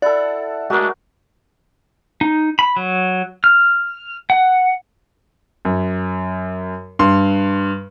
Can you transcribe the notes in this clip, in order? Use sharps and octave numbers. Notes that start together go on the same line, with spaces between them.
E4 A4 D5 F#5
G#3 A3 D4 F#4 A#4
D#4
B5
F#3
F6
F#5
F#2
G2 C6